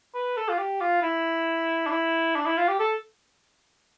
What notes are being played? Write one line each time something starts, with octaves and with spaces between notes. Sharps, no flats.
B4
A4
F4
G4
F4
E4
D4
E4
D4
E4
F4
G4
A4